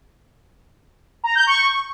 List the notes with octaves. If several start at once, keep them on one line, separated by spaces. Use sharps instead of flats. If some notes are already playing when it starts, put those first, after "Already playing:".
A#5
G6
C#6